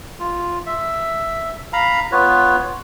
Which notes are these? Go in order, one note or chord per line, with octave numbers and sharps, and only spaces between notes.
F4
E5
F5 A#5 B5
B3 F4 B4 C#5